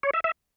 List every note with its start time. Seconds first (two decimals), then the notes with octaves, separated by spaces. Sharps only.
0.03 C#5
0.14 E5
0.24 E5